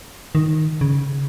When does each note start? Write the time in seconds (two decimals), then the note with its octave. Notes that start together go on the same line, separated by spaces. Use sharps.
0.35 D#3
0.81 C#3